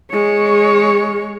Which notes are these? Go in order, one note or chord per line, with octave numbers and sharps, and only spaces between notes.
G#3 C#5